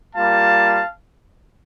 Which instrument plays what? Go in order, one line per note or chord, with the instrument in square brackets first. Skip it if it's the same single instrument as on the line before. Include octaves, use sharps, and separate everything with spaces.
[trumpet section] G3 A#3 F4 F5 A5